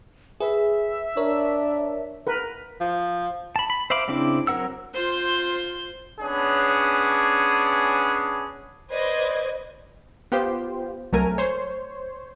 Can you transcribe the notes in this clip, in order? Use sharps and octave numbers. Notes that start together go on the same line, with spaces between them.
G#4 B4 E5
D4 A#4 C#5
A#4 B4
F3
A5 B5
B5
C5 E5 F5 B5 D6
C#3 C4 D4 E4 D6
F#3 C4 A#4 F#5 E6
F4 C5 G6
B3 C#4 D4 G#4
B4 C5 D5 D#5 G#6
B3 F4 G4 C5
C2 F#3 A3 A#4 G#5
C5 C#5